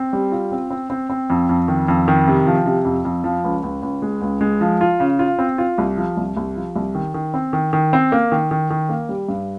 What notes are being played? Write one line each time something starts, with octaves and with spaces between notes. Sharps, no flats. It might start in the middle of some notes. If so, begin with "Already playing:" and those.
Already playing: C4
G3
F4
C4
C4
C4
C4
F2
F2
D#3
F2
D#3
C3
F3
C3
F2
F2
F3
C#2
C#2
C#2
G#3
C#2
G#3
F3
F4
C#3
F4
C4
F4
C2
F3
C2
C2
F3
C2
D#3
D#3
C4
D#3
D#3
C4
A#3
D#3
D#3
D#3
A#3
G3
G2